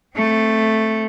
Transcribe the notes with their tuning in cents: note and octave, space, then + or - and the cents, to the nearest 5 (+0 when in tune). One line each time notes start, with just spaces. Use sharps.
A3 +0 C4 +0